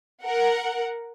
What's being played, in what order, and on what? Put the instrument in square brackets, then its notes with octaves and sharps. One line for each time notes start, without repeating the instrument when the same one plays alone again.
[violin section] A#4 F#5